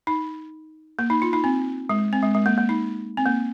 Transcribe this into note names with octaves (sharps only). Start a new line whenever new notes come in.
D#4
A#3
D#4
F4
D#4
C4
G#3
C4
G#3
G#3
A#3
A#3
D#4
C4
A#3